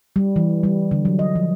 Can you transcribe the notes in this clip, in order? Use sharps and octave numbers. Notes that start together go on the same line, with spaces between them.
G3
E3
G3
D3
F#3
D#5
F3